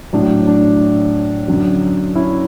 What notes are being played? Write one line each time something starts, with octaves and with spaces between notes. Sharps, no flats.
A2 F#3 D4
D4
F#2 D3 F#3
C#4 E4